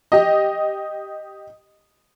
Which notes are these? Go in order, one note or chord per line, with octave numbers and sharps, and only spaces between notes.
G4 D#5